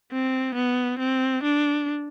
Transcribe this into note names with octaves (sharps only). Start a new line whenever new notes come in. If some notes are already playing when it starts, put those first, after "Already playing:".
C4
B3
C4
D4